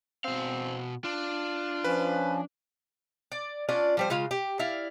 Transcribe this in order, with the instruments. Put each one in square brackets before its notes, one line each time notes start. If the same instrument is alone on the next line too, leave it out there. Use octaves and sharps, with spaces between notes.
[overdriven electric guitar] B2 F5 [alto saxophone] C4
[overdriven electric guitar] D4 [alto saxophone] F4
[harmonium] F3 C#4 [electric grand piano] B4
[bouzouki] D5
C#4 D4 F4 D5
F3 G3 C5
C#3 G#3 F4 F5
G4
E4 D5 F5